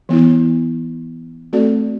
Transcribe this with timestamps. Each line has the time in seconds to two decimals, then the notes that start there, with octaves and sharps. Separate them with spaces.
0.09 E3 B3 E4
1.53 A3 C4 F#4 A4 D5